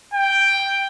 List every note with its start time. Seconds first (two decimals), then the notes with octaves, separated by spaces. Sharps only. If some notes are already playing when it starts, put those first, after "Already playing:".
0.14 G5